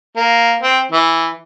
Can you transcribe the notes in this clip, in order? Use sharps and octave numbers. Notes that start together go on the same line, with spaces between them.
A#3
C4
E3